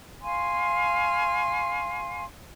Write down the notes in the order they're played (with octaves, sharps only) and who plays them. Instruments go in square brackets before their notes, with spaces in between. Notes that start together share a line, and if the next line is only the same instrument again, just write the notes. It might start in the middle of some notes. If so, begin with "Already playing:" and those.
[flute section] F5 G#5 C6 C#6